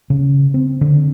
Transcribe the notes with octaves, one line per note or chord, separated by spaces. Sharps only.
C#3
C4
D3